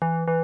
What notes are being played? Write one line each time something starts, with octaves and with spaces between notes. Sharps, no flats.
E3
E3